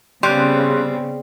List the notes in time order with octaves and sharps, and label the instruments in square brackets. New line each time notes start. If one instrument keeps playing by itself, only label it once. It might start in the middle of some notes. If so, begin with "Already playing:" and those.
[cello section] C#3 [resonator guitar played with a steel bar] G3 [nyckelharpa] B3 C4 [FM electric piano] C6 F#6